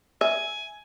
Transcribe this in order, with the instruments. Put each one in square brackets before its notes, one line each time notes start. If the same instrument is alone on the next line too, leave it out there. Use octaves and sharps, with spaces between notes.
[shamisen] E5 [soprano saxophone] G#5